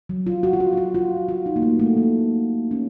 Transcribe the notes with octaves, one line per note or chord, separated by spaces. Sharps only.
F#3
F4
F#4
F4
F#4
F4
F#4
F4
F4
D#4
A#3
A3
A3
A#3
C#4